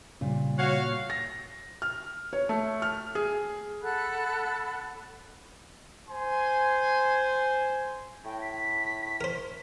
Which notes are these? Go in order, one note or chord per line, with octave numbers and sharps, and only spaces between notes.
A#2 C#3 G3
F#4 C#5 F5
A#6
F6
C#5
A3
F6
G#4
A4 F#5 B5 F#6
C5 G#5 C6
A2 G5
B6
A#4 C5